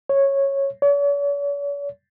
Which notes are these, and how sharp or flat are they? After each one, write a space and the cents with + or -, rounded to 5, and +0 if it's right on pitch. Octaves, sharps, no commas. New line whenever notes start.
C#5 -10
C#5 +45